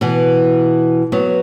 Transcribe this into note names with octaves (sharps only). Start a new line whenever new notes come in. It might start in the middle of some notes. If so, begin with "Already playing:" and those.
B2 E3
F#3 B3